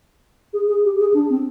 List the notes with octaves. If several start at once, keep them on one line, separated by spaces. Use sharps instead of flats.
G#4
G#4
G4
G#4
D4
C4